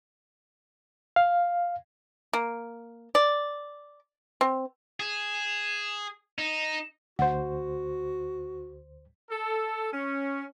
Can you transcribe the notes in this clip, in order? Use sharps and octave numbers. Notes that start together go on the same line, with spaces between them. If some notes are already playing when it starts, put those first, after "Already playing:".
F5
A#3
D5
C4
G#4 E7
D#4 E7
D2 F#4 C5 F#5
A4
C#4